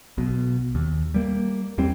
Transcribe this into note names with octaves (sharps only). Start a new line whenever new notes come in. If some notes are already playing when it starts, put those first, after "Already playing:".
B1 B2
D#2
G3 A#3
E2 E3 G3 C4